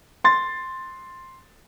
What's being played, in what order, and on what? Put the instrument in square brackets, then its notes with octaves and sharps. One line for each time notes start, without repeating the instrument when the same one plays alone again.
[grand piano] C6 A6